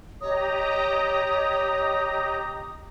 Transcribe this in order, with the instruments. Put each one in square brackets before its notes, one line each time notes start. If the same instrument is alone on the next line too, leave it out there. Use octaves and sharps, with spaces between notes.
[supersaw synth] G4 D#5 A#5 [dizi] C#5 [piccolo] D#6